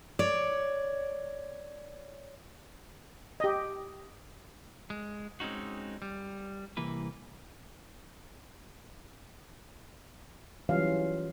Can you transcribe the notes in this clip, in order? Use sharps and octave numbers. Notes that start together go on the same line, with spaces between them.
C#5 D5
G4 D#5
G#3
G#3 C4 C#4 D#4 F#4
G3
C2 E3 A#3 B4
E3 F#3 G3 C#4 F4 F5